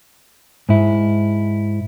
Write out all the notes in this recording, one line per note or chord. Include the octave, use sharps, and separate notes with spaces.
G#2 E4